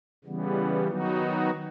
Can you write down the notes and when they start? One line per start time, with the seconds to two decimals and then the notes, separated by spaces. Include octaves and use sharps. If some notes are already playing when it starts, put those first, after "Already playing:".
0.25 C#3 E3 G3 B3
0.87 D#3 F#3 B3 D#4 F#4